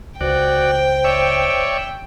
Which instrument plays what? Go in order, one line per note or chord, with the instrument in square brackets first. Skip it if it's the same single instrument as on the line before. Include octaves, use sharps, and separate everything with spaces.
[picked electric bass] C#2 [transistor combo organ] F#4 D5 [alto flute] C5 [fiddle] G5
[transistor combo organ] C#5 D5 E5